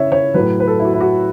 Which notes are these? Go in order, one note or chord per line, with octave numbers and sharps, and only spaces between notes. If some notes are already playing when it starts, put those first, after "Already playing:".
Already playing: C#3 E4 C#5 E5
C#5
A2 F#3 B4
B4
A4
E4
F#4
E4
F#4